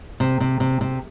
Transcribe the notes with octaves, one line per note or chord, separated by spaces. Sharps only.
C3
C3
C3
C3